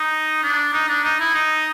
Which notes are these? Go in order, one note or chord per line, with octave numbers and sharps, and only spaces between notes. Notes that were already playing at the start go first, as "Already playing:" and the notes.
Already playing: D#4
D4
D#4
D4
D#4
E4
D#4